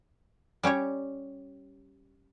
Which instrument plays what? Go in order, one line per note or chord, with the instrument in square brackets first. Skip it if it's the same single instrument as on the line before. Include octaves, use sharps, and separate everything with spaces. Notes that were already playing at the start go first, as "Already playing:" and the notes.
[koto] G3 C#4 G4 C#5